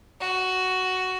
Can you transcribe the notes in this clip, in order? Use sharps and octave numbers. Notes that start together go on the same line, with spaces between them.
F#4